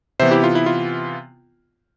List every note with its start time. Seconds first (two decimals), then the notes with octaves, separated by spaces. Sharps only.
0.20 C3 E3 B3 C5 E5
0.31 E4 G4
0.44 F4
0.55 E4
0.66 F4